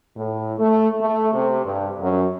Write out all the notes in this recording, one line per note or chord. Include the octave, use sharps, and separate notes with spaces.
A2
A3
A3
C3
G2
F#2